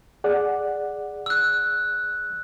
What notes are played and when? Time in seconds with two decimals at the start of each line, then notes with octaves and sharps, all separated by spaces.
0.24 G#4 D5 F#5
1.26 E6 F#6